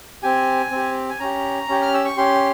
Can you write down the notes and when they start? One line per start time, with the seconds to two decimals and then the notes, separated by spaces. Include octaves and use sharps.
0.23 C4 G4 G#5
0.71 C4 G4
1.10 G#5
1.20 C#4 G4 A#5
1.68 C#4 G4
1.82 F6
1.94 E6
2.05 C#6
2.17 C#4 G4 C6